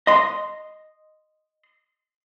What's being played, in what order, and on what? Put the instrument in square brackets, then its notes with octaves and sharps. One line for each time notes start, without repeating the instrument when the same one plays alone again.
[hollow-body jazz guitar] D#5 C6